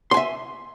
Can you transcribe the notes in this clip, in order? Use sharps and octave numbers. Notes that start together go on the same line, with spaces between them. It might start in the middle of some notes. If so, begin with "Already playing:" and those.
E5 G#5 C6